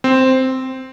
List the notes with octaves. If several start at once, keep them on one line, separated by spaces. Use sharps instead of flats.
C4